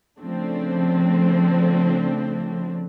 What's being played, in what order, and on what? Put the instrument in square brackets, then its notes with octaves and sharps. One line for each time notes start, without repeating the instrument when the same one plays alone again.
[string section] C#3 F3 A3 C4 D4